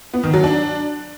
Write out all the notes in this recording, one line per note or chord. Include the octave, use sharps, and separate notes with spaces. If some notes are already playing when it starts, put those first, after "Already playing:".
B3
D#3
F#3
D4